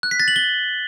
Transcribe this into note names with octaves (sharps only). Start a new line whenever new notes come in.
F#6
B6
A6
F#7
G7